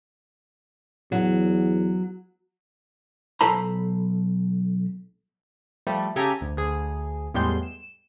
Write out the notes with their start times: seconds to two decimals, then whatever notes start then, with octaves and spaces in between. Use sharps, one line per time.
1.12 E2 F#3
3.41 B1 A4 C5 A#5 B5
5.87 F3 G3 A3
6.16 C#3 G4 A4 G#5 A#5 B6
6.41 D2
6.57 D2 G#4
7.34 E2 A2 G3 G#3 C6 G6
7.63 E7